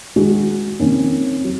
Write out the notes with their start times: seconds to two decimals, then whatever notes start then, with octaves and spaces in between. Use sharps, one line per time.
0.16 D#3 G#3 D#4 F#4
0.79 F2 C3 D#3 A#3 C#4
1.44 F#3